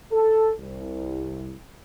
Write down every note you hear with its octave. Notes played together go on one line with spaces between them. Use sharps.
A4
C2